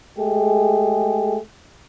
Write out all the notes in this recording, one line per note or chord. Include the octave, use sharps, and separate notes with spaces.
G#3 A3 G4 G#4